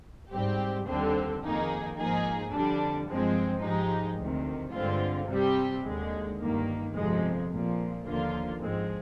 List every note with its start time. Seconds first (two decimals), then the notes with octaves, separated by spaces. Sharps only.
0.31 G#2 G3 C4 G4
0.86 D#2 D3 G3 C4
1.42 F2 D#3 A#3 D#4 G#4
1.97 G#2 F3 A#3 D#4 G#4
2.52 F2 D3 G3 D4
3.07 G2 F3 G#3 C4
3.62 G#2 F3 G#3 D#4 G4
4.18 D2 C3 D#3
4.73 G2 D3 G#3 C4 F4
5.28 C3 G3 C4 G4
5.83 D#2 D3 G#3
6.39 G1 G2 D#3 A#3
6.94 G1 F2 C3 F3 G#3
7.49 A#1 A#2 F3
8.04 D#2 D3 F3 A#3 F4
8.60 G#2 F3 G#3 C4